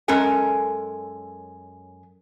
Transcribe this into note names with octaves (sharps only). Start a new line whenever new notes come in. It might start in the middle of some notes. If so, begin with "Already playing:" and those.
F#2 G#3 C#4 A4 A#4 G#5